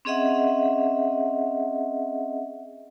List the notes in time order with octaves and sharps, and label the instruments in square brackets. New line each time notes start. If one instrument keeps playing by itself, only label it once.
[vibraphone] C4 C#4 G#4 D#5 E5 F#5